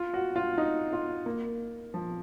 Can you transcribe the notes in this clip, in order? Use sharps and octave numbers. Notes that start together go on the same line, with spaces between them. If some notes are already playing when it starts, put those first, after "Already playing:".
Already playing: F4
F#4
F4
D#4
F4
A#3
F3